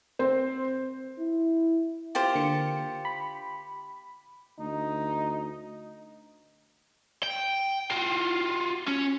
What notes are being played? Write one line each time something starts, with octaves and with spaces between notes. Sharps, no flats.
C4 C5
E4
F4 G4 C5
D3 A#3 C#7
B5
D2 D#4
G5
F4 F#4
C#4